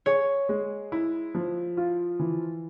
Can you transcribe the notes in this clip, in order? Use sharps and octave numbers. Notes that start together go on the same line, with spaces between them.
G#4 C#5
G#3
E4
F3
F4
E3